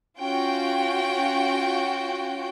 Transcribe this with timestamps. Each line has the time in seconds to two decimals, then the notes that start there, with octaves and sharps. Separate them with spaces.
0.18 C#4 F4 F#4 G5